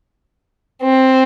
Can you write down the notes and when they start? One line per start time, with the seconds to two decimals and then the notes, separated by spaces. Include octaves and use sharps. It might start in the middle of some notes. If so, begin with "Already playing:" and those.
0.83 C4